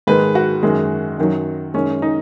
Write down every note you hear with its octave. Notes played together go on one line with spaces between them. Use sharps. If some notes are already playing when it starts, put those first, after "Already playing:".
G#2 D#3 G#3 B4
F#4
F#2 D#3 G#3
F#2 D#3 F#3
F#2 D#3 G#3 C#4
D#4